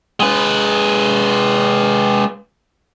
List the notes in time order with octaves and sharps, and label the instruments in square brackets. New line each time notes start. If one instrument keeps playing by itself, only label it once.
[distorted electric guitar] G#3 B4